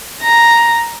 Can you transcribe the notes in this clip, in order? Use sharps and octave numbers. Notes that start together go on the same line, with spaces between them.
A#5